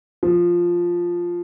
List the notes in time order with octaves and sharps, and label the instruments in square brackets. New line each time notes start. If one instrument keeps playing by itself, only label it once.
[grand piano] F3